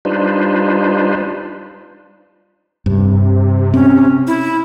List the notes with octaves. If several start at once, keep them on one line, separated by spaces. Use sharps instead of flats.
G3 D4 D#4 F4 B4 C5
G2 C3
C4 C#4
E4